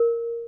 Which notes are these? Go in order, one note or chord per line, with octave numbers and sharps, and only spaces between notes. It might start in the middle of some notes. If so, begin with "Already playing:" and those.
Already playing: A#4